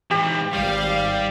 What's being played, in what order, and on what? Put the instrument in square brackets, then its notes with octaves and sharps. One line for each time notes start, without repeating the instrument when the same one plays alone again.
[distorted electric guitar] G#2 E3 [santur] G4
[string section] G#1 F5 [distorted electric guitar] G3